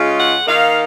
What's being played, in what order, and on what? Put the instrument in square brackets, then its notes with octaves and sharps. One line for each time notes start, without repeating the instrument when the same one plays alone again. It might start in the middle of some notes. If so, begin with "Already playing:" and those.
Already playing: [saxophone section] C#3 G#3 C#4 F4
F#5
D#3 A#3 D#4 F5